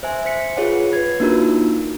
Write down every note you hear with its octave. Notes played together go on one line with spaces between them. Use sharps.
C5 E5 G#5
C5 B6 C#7
F4 G#4 B4 C#5 F#5
B4 G#6
A#3 D4 D#4 F4 F#4 A#4